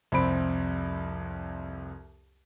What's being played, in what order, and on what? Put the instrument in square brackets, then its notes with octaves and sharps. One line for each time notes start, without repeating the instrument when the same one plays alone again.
[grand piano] C2 F2 C4 B5 D7